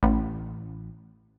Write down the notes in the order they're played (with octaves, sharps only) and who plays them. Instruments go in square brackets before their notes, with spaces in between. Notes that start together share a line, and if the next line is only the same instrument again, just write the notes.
[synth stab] A1